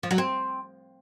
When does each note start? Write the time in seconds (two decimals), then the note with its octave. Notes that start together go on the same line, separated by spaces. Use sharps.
0.03 F3
0.11 F#3
0.18 C4